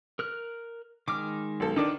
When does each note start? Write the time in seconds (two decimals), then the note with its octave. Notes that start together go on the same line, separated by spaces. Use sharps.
0.19 A#4 F6 F#6
1.08 D#3 G#3 D6 F6
1.60 B1 A4
1.76 D3 D#3 D4 B4 D6